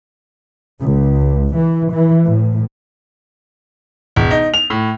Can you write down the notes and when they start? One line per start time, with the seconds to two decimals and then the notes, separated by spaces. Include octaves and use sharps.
0.81 C#2
1.56 E3
1.92 E3
2.27 A2
4.16 E1
4.31 D#4
4.54 F7
4.70 A2